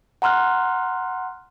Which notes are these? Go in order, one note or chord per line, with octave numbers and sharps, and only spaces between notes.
F#5 A#5 C6 F6 F#6